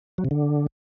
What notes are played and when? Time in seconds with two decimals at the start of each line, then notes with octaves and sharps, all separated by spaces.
0.18 F#3
0.25 C3
0.31 D3